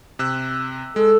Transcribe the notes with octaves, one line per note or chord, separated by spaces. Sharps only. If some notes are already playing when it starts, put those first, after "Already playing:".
C3 E6 F#6
G#3 A4